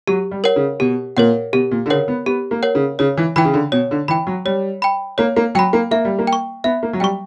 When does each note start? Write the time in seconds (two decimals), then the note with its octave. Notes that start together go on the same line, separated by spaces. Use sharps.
0.07 F#3 G4
0.31 G3
0.44 A#4 C#5 F#5
0.56 C#3
0.80 B2 G4
1.17 A#2 A#4 C#5 F#5
1.53 B2 G4
1.71 A#2
1.86 D3
1.90 C#3 A#4 C#5 F#5
2.08 B3
2.26 B3 G4
2.51 A#3
2.63 A#4 C#5 F#5
2.75 C#3
2.99 C#3 C#5
3.17 E3
3.36 E3 G5 B5
3.45 C#3
3.54 D3
3.72 B2 C#5
3.91 D3
4.08 E3 G5 B5
4.27 F#3
4.45 G3 C#5
4.82 G5 B5
5.18 A#3 C#5
5.36 A#3
5.55 F#3 G5 B5
5.73 A#3
5.91 A#3 E5
6.05 G3
6.19 A#3
6.27 G5
6.33 C#6
6.64 B3 E5
6.83 A#3
6.93 F#3
7.00 G3 G5
7.04 C#6